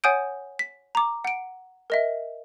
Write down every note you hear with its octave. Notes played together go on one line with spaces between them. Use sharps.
C#5 F#5 G#5 D#6 G6 D7
B6
A#5 D6
F#5 D7
A#4 D#5 E5